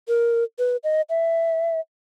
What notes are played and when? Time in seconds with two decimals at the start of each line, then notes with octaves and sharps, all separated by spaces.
0.08 A#4
0.59 B4
0.84 D#5
1.10 E5